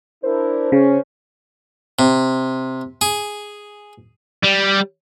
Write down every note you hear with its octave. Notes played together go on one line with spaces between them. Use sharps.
D4 E4 A#4 C5
C#3 C#4
C3
G#4
G3